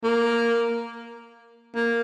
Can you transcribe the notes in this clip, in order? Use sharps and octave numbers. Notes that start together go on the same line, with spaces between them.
A#3
A#3